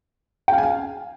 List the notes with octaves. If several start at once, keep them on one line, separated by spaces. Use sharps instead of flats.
G5
F5
G#5
F5